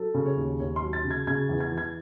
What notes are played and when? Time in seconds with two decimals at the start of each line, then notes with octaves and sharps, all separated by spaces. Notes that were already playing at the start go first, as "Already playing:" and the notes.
Already playing: F#3 A4
0.14 C#3
0.26 C#5
0.37 D#2
0.60 D#2 C#5
0.76 C6
0.82 F#3
0.93 A6
1.04 C#3
1.11 G#6
1.27 C#3 G#6
1.49 E2
1.60 G#6
1.72 E3
1.78 G#6